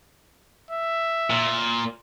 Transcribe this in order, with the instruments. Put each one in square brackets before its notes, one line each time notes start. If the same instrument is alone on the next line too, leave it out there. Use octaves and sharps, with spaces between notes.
[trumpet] E5
[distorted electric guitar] A#2